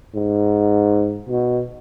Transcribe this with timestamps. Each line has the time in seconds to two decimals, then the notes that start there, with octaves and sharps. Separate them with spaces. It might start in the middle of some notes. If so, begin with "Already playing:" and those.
0.15 G#2
1.29 B2